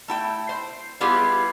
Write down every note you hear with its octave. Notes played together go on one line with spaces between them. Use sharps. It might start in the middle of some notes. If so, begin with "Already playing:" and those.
A3 E4 G5
C5
G3 B3 E4 F4 G4 G#4